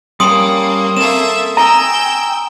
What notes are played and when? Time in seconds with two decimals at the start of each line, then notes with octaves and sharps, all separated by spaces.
0.20 G3 A#3 C#4 G5 C6 D#6
0.97 A#3 C4 A4 E5 E7
1.57 G5 G#5 A#5 D#6 E6